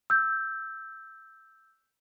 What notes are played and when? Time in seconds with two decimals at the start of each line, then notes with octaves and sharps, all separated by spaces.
0.10 E6 G6